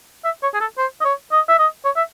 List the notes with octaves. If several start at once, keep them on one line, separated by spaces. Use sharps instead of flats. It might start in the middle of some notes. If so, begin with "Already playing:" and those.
E5
C#5
G#4
A4
C5
D#5
C#5
D#5
E5
D#5
C#5
E5